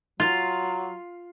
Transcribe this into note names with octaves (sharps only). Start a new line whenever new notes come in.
F#3 F4 F5